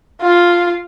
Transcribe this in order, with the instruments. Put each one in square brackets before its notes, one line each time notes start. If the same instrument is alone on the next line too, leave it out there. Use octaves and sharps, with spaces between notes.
[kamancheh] F4